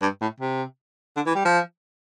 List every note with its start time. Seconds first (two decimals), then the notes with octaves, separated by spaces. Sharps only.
0.02 G2
0.21 A2
0.40 C3
1.16 D3
1.26 E3
1.35 G3
1.45 F3